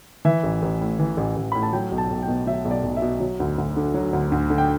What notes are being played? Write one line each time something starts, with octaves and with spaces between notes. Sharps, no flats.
E3 E5
A1
A1
A2
E3
A1
A1
A2 B5
A5
F#3 G5
B1
A5
B1
G5
B2
F#3 E5
B1
D5
B1
E5
B2
F#3
D2
D2
D3
F#3
D2
D2
D3
G5